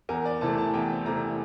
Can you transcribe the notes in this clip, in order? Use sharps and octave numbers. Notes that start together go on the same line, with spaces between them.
E2 A#4
D5
C3 E3 A3 A5
A5
E2 G5
C3 E3 A3 A#5